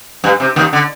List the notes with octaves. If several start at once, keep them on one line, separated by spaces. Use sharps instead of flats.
G2
C3
D#2 D#3
D3